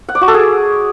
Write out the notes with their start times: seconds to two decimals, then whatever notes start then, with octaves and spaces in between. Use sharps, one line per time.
0.09 F#5
0.15 D5
0.21 F#4
0.28 A4
0.34 G#4